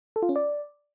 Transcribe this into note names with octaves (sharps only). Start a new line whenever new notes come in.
A4
F4
C#4
D5